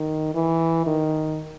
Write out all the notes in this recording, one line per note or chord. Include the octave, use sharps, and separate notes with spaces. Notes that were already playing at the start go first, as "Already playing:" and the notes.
Already playing: D#3
E3
D#3